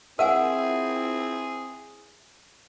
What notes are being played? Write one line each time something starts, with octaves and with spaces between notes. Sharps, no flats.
C4 E4 G#4 A#4 E5 F#5 G#5